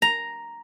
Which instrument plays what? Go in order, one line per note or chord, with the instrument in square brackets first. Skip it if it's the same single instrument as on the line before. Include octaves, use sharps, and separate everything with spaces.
[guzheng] A#5